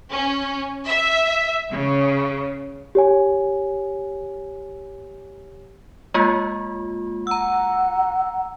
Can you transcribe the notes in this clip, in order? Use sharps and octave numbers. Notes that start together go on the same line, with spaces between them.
C#4
E5
C#3
G4 C#5 G#5
G#3 A#3 F4
F#5 A#5 E6